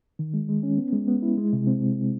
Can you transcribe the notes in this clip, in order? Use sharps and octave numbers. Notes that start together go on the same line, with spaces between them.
D#3
G#3
G#3
C#4
B3
G#3
B3
E4
G#3
C3
C4